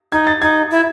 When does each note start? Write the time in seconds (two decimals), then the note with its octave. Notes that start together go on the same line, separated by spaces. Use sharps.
0.12 D#4 G#6
0.27 A6
0.42 D#4 G#6
0.71 E4